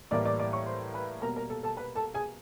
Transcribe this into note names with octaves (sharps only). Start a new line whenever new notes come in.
A2 E3 G3 A#3 D5 D6
D5 D6
D5 D6
C#5 C#6
C5 C6
B4 B5
B2 G3 A#3 A#4 A#5
A#4 A#5
A4 A5
A4 A5
B4 B5
A4 A5
G#4 G#5